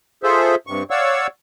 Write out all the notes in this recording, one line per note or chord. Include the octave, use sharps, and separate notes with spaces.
F4 G#4 A4 C5 E5
G2 C3 C#6
C#5 D5 F5 F#5 C#6 E6